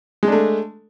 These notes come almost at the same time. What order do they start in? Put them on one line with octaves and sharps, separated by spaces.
G#3 D4 A3